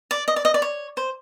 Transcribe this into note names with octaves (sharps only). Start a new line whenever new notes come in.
D5
D#5
D5
D#5
D5
C#5
C5